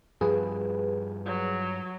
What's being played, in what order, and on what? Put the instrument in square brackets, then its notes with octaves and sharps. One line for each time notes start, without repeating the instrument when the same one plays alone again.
[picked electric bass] G2 F3 [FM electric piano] G#4 B4
[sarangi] F#3